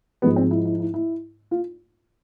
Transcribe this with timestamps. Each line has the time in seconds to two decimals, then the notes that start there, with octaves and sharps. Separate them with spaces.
0.22 G#2 F3 G#3 B3
0.36 C4
0.51 E4
0.65 E4
0.80 E4
0.94 E4
1.51 F4